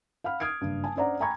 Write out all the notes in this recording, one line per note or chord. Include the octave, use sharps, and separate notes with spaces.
F5 F#5 B5 F6
D#6 F6 G#6 C7 D7
F#1 G2
G#5 A5
C#4 D4 C5 D5 F#5 A#5
G5 G#5 A#5 B5 C#6 G#6